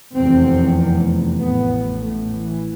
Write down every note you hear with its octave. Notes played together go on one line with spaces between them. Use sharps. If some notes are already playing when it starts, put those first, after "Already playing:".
F1 E2 C3 C4
A1 A2 B3
A3
E3